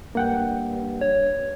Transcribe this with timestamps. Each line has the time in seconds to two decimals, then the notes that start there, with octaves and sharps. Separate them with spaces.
0.15 G2 A#3 F#5 G5
1.01 C#5